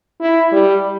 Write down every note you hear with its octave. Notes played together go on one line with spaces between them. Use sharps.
E4
G3